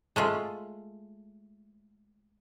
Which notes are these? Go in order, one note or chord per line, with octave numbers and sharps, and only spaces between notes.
G#3 A3 F4